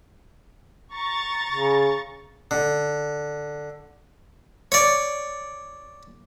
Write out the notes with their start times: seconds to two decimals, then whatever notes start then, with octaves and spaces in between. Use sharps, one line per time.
0.92 A#5 C#6 A6
1.52 C#3
2.51 D3
4.72 C#5 D5